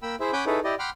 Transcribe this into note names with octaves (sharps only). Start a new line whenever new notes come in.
A#3 G5 B5 E6
E4 G#4 C5 E5
C#4 F#5 G#5 B5 D6 G6
D#4 E4 G#4 A4 B4 C#5
E4 G4 D5 D#5
F#5 G5 B5 C6 D6 F6